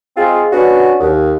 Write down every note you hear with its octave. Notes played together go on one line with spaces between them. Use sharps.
G#3 C4 F4 G#4
B3 C#4 D4 F#4
D#2